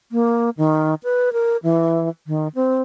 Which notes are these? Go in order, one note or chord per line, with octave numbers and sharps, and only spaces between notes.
A#3
D#3
B4
A#4
E3
D#3
C4